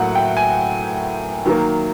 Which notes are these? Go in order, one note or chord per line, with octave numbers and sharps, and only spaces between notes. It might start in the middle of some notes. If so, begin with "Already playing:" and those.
Already playing: A2 F#3 A#3 F#5
G5
G#5
D#3 F#3 A#3